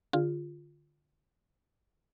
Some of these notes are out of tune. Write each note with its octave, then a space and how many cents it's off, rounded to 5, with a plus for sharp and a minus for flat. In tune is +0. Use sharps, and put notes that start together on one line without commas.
D3 +0 F4 +0 G#4 -35